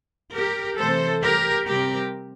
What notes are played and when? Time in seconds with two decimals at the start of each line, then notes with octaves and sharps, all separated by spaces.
0.33 G4 A#4
0.77 C3 E3 A3 A4 C5
1.22 G4 A#4
1.66 C3 G3 C4 G4 A#4